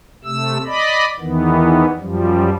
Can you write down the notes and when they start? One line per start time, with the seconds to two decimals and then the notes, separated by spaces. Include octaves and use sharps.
0.24 C3 A3 E6
0.66 D5 D#5 B5
1.20 E2 D#3 E3 B3
1.99 F#2 F3 G3